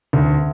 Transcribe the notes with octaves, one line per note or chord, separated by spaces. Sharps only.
D2